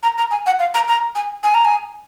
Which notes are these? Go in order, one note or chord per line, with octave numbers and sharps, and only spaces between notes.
A#5
A#5
G#5
F#5
F5
A#5
A#5
G#5
G#5
A#5
G#5